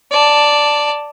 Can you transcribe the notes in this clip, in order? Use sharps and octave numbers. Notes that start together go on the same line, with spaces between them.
D5 A5